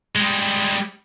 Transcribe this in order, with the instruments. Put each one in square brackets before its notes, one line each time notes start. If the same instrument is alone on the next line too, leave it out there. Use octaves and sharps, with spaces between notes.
[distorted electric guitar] G3 G#3